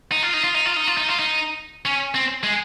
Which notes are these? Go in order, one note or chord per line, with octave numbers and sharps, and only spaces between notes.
D#4
F4
D#4
F4
D#4
F4
D#4
F4
D#4
F4
D#4
C#4
C4
G#3